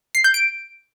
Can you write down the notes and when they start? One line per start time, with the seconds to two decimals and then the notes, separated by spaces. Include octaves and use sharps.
0.15 C7
0.24 G6
0.34 D7